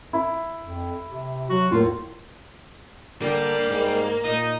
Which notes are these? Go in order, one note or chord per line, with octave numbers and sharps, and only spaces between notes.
E4
F2
C3
F#3 F#4
E2 A2 A#3 F4
D3 G3 A#3
G#2
A#2 D#4